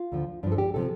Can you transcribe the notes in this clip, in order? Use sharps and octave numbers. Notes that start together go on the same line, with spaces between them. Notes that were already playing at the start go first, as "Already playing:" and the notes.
Already playing: F4
D2 D3 F3
G2 F3 D4
A4
G4
C3 F3 A4